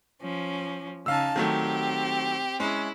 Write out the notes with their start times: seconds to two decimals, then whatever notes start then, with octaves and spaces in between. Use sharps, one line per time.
0.22 F3 C#4
1.06 C#3 D#4 F5 A5 E6
1.36 D#3 F#3 A3 C4 G4
2.60 G#3 C#4 E4